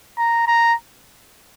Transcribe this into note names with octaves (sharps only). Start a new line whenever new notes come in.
A#5
A#5